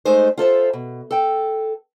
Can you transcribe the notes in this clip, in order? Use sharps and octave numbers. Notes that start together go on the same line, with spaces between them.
G#3 A3 D#4 C5
F4 A4 C5 E5
B2
A4 G5